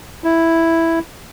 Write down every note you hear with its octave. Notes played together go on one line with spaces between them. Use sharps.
E4